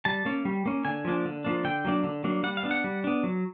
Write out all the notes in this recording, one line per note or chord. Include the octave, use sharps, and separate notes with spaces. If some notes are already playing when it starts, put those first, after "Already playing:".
G3 A5
A#3 C#4
G3
A#3 C#4
D3 G#5
F3 A#3 D4
D3
F3 A#3 D4
D3 G5
F#3 A#3 D4
D3
F#3 A#3 D4
G3 F#5
F5
B3 D4
F#5
G3
B3 D4
F#3